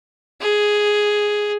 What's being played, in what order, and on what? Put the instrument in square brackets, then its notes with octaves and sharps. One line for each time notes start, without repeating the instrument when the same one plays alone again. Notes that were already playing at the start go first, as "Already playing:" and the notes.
[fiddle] G#4